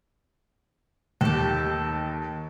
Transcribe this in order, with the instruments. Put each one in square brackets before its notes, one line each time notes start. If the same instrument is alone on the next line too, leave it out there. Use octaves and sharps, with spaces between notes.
[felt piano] D#2 [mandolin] G4 A4